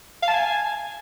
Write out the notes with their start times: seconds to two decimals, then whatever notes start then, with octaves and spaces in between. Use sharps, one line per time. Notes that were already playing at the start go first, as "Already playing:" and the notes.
0.23 F5
0.28 A5
0.33 G#5